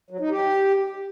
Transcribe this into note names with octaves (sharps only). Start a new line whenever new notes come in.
F#3
D#4
G4